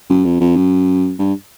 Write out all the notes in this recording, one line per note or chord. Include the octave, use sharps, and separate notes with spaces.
F#2
F2
F2
F#2
G2